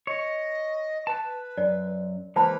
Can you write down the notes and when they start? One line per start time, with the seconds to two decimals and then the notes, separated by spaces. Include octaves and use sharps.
0.07 C#5 D#5
1.07 B4 A5
1.57 F#2 D5
2.36 E3 G#3 A#3 B4 C5 A5 B5